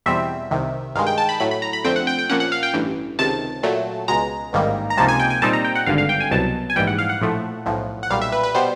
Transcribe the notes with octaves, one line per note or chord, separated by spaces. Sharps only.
E2 B2 G3 C4 E5
C2 C3 D#3
G2 D#3 G#3 F5
G5
A5
B5
A2 F#3 A3 B5
B5
A#5
B5
F2 D3 F3 A3 C4 G5
F#5
G5
G5
A#2 F3 A#3 C#4 F#5
F#5
F5
G5
A1 G2 E3
C#2 C3 D#3 A5
A#2 F#3 A3
C#2 B2 G#3 A#5
A1 G#2 D#3 G3 A#3
A#5
C#2 C3 F3 A#3 D#4 A5
G#5
G5
G#5
A#2 G3 C4 D#4 A5
A#5
G5
F#5
G#1 G2 D3 F5
F5
G5
G#5
C2 B2 F#3 A5
G#5
A#1 G#2 E3 G3 G5
F#5
F5
F#5
A#1 A2 F3 A3
B1 A2 F3
F#5
B1 A#2 G3 F5
E5
B4
B4
B2 G3 B3 C5